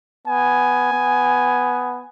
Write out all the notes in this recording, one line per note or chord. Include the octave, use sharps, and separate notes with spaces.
B3 G#5
B3